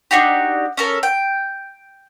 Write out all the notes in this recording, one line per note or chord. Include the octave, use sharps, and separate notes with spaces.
D4 D#4 F#4 G4
C#4 A4 A#4
G5